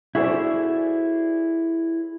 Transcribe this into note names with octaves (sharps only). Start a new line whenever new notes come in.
E4 F#4 G#4 A4 C5 D5